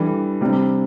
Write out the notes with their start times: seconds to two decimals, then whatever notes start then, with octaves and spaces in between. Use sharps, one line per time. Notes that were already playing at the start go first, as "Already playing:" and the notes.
Already playing: E3 G3 D4 A4
0.41 C3 G3 D4